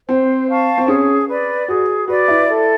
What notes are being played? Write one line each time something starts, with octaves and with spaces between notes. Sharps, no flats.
C4 C5
F5 A5 C#6
C4
C#4 G#4
B4 D5
F#4 G#4
F#4 B4 D5
E4
A4